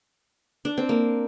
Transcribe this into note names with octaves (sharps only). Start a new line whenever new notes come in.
D4
C4
A#3